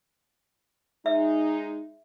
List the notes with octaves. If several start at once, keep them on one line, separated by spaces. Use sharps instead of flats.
G#3 D#4 E5